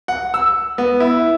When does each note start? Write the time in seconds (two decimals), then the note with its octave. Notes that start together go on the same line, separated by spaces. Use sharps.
0.08 F#5
0.34 E6
0.78 B3
1.00 E4